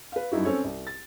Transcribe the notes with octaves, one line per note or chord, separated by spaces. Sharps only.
B4 F5
F#2 G3 D#4 E4 F#4
C4 C#4 A4 C#5
C2
A6